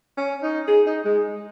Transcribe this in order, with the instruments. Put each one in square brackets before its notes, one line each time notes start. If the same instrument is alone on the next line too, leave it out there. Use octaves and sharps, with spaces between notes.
[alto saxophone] C#4
D#4
G#4
D#4
G#3